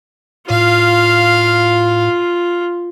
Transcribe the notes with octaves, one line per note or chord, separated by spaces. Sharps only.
A2 F4 F5